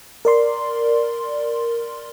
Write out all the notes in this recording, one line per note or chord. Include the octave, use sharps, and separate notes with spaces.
A#4 D5 C6